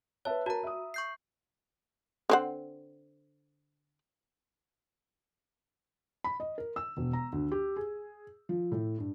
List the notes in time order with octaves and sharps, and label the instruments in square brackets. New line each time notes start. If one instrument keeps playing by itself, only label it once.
[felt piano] B4 E5 A5 [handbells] C#5
[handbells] F#4 A#5 [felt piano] A#4 A5
[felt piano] E5 D#6
[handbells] C#6 G6 C7
[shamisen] D3 C4 F#5
[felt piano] B5
D#5
A#4
E6
E1
A#5
D2
G4
G#4
F3
A2
G2